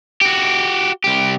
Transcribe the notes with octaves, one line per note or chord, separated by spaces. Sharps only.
F#4 G4
C2 G4